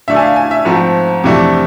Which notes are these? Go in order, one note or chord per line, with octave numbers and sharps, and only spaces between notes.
D3 A3 D4 E5
G#5
F5
G#5
E5
G#2 F3 A3 C4
F2 C3 E3 A3 D4